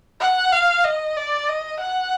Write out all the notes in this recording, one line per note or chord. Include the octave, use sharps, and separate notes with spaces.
F#5
F5
D#5
D5
D#5
F#5